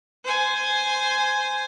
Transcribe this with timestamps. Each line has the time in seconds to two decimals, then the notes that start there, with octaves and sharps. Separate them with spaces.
0.25 C5 G#5